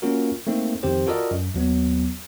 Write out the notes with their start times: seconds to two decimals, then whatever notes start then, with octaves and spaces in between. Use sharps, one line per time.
0.02 A#3 C#4 F4 F#4 A#4
0.47 A3 A#3 C4 D#4
0.83 F2 D#3 C4 G4 C5
1.07 F4 F#4 A4 A#4 D5 D#5
1.31 F#2
1.54 D#2 F#3 B3